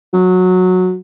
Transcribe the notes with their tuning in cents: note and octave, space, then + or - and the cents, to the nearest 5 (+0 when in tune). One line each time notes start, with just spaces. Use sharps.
F#3 -15